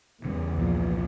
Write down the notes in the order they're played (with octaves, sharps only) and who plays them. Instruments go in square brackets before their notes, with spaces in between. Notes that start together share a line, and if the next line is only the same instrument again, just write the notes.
[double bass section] E2 [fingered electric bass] C#3 G3
[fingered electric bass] C2 A#2 F3